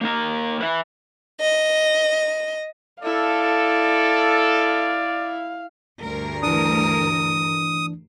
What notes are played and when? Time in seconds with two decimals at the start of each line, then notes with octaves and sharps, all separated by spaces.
0.01 A#3 D#4 A#4
0.61 B4 E5
1.39 D#5
3.03 E4 A4 D5 F5
6.01 D2 G2 A#4
6.43 E3 D4 D#6